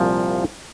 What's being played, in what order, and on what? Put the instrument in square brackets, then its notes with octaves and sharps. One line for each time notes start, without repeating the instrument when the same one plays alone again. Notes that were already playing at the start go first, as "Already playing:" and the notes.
Already playing: [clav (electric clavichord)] C2 A#2 F3